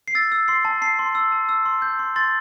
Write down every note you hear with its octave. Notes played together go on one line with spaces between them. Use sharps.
C7
E6 A6
E6
C6 C7
A5
A5 C7
C6
E6
A5
E6
C6
G6
C6
C6 A6